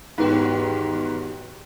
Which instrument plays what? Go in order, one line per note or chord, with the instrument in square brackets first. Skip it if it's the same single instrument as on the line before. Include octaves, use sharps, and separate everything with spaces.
[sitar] D#2 F#4 G4 [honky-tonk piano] G#2 B3